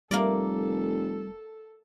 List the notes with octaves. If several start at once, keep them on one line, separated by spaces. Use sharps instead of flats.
F1 G3 A#3 A4 A#4 D5